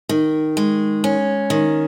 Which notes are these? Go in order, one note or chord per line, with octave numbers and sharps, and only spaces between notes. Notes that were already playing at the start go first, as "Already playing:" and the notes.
D#3
G#3
C#4
D#3